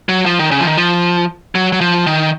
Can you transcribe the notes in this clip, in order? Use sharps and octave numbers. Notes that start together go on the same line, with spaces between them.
F#3
F3
D#3
C#3
F3
D#3
F3
F#3
F#3
F3
D#3